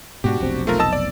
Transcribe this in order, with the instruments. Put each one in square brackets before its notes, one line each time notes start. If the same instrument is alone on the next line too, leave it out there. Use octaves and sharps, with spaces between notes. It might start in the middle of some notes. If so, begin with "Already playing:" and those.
[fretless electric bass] G#2 B2 [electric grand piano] D4 F#4 G4
[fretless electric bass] F1 B1 C4
[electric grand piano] A3 F4 A#4
D#5 A5 E6
D5